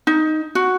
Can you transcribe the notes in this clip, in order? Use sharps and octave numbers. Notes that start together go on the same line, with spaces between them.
D#4
F#4